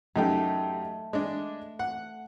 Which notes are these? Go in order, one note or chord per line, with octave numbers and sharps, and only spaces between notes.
F#2 A3 D#4 G4
G#3 D4
F#5